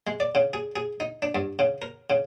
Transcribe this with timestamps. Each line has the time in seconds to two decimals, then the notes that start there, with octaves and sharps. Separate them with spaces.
0.07 G#3
0.20 D5
0.35 C#3
0.53 G#4
0.76 G#4
1.00 D#4
1.22 D4
1.35 G2
1.59 C#3
1.82 A#4
2.10 C#3